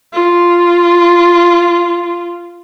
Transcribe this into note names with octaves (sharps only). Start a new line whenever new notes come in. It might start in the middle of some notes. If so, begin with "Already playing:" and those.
F4